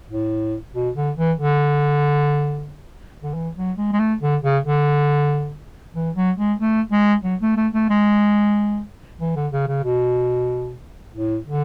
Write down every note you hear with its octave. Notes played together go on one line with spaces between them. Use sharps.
A2
B2
D3
E3
D3
D3
E3
F#3
G#3
G#3
A3
D3
C#3
D3
E3
F#3
G#3
A3
G#3
F#3
A3
A3
A3
G#3
E3
D3
C#3
C#3
B2
A2
D3